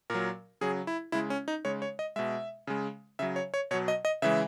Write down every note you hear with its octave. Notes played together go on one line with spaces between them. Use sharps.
A#2 F#3 A#4
C#3 F#3 G#4
E4
C#3 G#3 E4
C#4
D#4
C#3 G#3 C#5
C#5
D#5
B2 G#3 E5
C#3 G#3
C#3 F#3 E5
C#5
C#5
B2 F#3 C#5
D#5
D#5
C#3 E3 G#3 E5